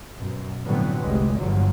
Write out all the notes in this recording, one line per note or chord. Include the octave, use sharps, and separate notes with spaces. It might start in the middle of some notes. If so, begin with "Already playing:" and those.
F#2 B2
A2 D3 F3 F#3 B3 C4
F1 C2 G3 G#3
G1 E2 D3 F3 F#3